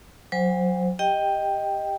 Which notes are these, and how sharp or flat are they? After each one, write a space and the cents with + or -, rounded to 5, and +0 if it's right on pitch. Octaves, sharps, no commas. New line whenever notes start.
F#3 -15 C5 +5 G#5 -45
G4 +15 D#5 +0 G5 +0